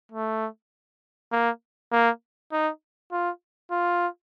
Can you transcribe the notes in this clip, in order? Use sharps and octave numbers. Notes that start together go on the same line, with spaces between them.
A3
A#3
A#3
D#4
F4
F4